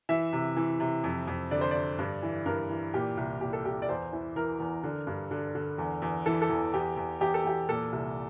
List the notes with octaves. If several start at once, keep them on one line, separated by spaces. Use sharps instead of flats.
E3 E5
C3
E3
C3
F2
F2
D3 D5
C5
D3 D5
G2
E3
G2 A#4
E3
A#2 G4
C2
A#2 G4
A4
C2 G4
D5
E2 C5
E3
E3 A#4
E2
D3
G2
D3
D3
E2
E2
E3 A4
A4
E2
E2 G4
E2
E2 G4
A4
E2 G4
A#2 A4
C2